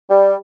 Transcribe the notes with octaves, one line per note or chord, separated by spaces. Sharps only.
G3